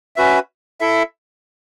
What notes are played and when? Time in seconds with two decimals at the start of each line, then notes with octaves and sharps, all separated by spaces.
0.16 C#4 F#4 B4 E5
0.81 E4 A4 E5